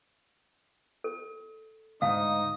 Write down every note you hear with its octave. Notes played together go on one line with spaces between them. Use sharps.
A4
D2 G#2 D#4 F5 D#6